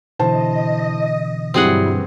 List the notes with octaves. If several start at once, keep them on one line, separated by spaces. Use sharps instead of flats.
B2 D3 E3 E4 C5 D#5 A5
G2 F#3 G3 C4 E4 G#4 F#5